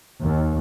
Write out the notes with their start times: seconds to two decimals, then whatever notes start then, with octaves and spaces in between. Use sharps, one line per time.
0.23 D#2